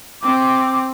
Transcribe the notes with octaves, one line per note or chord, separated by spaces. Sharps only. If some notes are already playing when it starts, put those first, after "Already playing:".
C4 D6